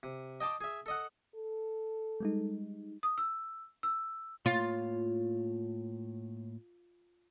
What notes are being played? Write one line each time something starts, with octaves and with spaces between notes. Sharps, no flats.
C3
D#5 G5 A5 C6 D6
G#4 E5
A4 D#5 F#5
A4
G3 G#3 D#4
D#6
E6
E6
A2 A#3 F4 C#5